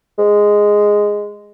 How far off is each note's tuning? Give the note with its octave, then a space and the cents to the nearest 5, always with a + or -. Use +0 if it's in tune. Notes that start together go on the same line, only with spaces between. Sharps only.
G#3 -5